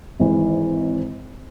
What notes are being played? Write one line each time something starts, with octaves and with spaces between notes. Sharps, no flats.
G#1 G#2 E3